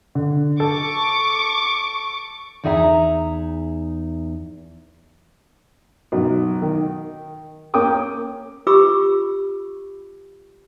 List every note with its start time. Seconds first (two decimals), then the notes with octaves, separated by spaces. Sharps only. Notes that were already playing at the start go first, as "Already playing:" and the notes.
0.15 D3
0.60 A4 C#6 D6
2.64 E2 D#4 G#4 E5 G5 A#5
6.12 B1 F#2
6.62 D#3
7.74 A#3 C#4 A#4 G5 D6 D#6
8.67 F4 G4 B4 B5 D6 E6